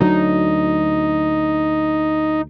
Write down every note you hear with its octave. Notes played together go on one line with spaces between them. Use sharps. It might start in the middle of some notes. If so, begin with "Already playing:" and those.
D2 F#3 D4 D#4